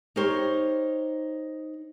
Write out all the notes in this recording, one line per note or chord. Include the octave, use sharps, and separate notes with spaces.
D#4 G4 A#4 C5 C#5